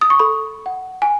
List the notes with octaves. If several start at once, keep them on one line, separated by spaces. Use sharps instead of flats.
D#6
C#6
A4 B5
F#5
G#5